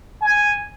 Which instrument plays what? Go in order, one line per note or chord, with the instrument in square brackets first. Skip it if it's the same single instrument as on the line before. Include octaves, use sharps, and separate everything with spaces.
[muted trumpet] G#5